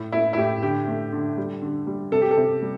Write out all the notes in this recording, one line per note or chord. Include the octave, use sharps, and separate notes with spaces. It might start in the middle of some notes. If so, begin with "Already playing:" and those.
Already playing: A2
A3 E4
E4
A2 G4
D3 G4
A3
D3
G3
D3
G3
C3 A4
G4
A4
C3
G3